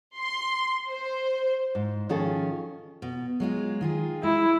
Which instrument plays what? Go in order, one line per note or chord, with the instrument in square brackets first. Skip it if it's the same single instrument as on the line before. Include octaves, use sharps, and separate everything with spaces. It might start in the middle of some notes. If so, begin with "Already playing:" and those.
[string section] C6
C5
[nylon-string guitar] G#2
D#3 F3 C#4 F#4 G#4 A4
[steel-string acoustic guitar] B2
F#3 G#3 F4
D#3 F4 G#4
[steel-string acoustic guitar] G#3 [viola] E4